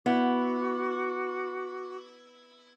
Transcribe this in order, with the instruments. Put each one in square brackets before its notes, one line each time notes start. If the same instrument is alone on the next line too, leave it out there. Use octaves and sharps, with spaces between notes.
[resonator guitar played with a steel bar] B3 E4 [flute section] F#4 D6